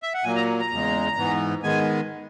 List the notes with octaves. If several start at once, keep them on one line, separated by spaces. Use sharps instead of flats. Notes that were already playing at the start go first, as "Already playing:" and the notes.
E5
F#5
A#2 F#3 A#3 G#5
A#5
A#5
E2 C#3 G#3
G#2 E3 B3
D#3 G#3 B3 G#5